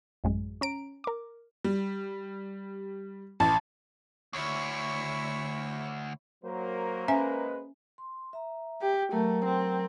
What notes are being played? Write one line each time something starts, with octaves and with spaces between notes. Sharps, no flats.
A1 F#2 G#3
C#4 A#5 D7
A#4 D6
G3
A1 A5
D2 E4 C#5
F#3 A#3 A#4 C5
G#3 C#4 B4 E5 G#5
C6
E5 A#5
G4
F#3 A3 A#4 A#5
C4